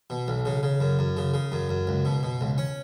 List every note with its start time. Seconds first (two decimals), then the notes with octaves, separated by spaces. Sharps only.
0.10 B2
0.28 B1
0.45 C#3
0.63 C#3
0.80 F#2
0.99 F#2
1.17 C#3
1.34 C#3
1.52 F#2
1.69 F#2
1.87 C#2
2.05 B2
2.23 B2
2.41 C#2
2.58 C#4